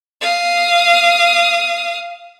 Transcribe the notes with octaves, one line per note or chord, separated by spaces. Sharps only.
F5 D#6